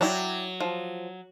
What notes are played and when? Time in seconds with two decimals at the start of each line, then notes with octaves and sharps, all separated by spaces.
0.01 F#3 D4 E4 G5
0.60 F3